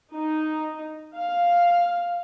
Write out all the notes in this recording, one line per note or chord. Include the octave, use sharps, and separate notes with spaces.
D#4
F5